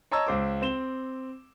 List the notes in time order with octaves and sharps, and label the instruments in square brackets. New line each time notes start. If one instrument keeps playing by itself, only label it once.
[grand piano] C#5 D#5 A5 A#5 C#6 E6
C#2 C5 D6
C4 E7 G7